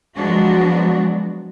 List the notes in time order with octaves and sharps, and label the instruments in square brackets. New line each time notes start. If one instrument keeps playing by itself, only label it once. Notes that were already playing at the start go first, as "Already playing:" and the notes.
[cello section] F3 F#3 G#3 B3 D4 F#4